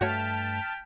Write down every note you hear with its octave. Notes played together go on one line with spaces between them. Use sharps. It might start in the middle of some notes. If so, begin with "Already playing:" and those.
G2 A3 F#4 C#5 G5 A5 F6 B6